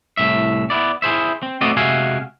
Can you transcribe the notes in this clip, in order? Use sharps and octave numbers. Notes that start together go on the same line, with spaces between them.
C2 A2 E5
B3 E4 D5
E4 G#4 C5 E5
C4
A3 B3 C4 F#4 D5 D#5
C3 G#3 F#4 E5 F5 G#5